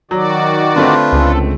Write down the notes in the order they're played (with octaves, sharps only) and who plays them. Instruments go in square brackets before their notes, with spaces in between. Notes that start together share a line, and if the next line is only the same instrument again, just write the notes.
[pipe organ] D#3 F#4 D5 [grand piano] F#3
[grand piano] D3 A3 C4 [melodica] D4 F4 B4
[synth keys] C#2 [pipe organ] A4